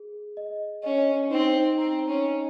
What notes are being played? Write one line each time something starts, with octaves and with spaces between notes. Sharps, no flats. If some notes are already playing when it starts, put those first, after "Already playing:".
Already playing: G#4
D#5
C#4 D#5
C4 D#4
C4 A#5
C#4
D#5